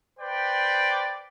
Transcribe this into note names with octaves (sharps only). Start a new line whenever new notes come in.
B4 C5 D5 G5